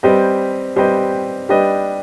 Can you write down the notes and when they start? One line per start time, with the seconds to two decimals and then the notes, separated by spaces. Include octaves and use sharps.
0.03 G3 C4 G4 B4 D#5
0.76 G3 C4 G4 B4 D#5
1.49 G3 D4 G4 B4 D#5